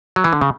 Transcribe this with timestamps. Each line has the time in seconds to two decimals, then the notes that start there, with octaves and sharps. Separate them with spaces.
0.16 F#3
0.24 E3
0.33 D3
0.41 C#3